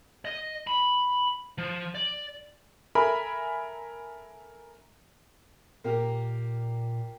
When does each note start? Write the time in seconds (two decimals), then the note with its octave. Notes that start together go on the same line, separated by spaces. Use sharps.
0.25 D#5
0.67 B5
1.58 F3
1.95 D5
2.95 A4 A#4 E5 G#5 B5
5.84 A#2 A#3 G4 A#4